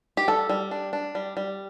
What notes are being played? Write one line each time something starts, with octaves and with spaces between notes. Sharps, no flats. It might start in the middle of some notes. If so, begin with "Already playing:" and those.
G4
G3 A4
G3
D4
D4
G3
G3